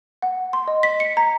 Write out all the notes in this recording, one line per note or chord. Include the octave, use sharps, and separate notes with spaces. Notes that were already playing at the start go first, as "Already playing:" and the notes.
F#5
C6
D#5
B6
C#7
A#5